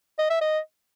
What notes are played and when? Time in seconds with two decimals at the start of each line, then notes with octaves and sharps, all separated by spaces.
0.19 D#5
0.30 E5
0.41 D#5